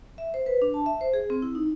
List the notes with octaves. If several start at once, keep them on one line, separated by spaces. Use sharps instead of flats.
E5
C5
B4
D4
A5
E5
C5
G#4
C4
E4
D#4